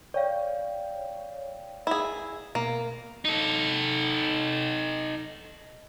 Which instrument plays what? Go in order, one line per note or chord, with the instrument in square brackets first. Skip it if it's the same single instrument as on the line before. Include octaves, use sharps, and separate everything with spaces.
[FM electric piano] C#5 G5 [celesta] D5 F5
[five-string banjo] E4 G#4
[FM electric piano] B2 [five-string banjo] A#3
[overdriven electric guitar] D#4 A4